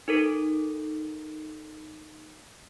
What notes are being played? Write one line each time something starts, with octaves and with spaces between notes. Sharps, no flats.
D#4 A4 A#4